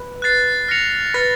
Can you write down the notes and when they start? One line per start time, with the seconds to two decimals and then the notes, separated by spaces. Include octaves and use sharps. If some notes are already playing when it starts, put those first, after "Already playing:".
Already playing: B4
0.22 F#6 A6 C7
0.68 F6 A#6 C#7 F7
1.14 B4 F6 A6 C#7